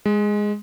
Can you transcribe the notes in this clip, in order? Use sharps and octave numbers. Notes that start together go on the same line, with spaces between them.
G#3